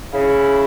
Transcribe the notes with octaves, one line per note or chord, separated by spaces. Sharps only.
C#3 E4